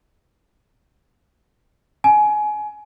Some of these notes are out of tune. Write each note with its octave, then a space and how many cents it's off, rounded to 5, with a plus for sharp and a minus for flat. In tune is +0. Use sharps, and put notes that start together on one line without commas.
G#5 +25